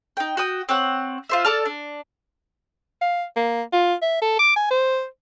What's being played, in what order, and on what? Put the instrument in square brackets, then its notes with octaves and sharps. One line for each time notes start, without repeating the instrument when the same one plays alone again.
[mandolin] D#4 G5
F#4 G5 D#6
C4 C#5 F#5
F4 C5 E5
A4 D5 A5 F6
D4
[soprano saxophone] F5
A#3
F4
E5
A4
D6
G#5
C5